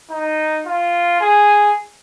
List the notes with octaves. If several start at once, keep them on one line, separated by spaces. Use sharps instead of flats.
D#4
F4
G#4